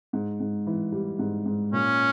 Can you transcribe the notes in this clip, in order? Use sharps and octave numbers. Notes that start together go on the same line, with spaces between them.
G#2
G#2
E3
G3
G#2
G#2
A#2 C#4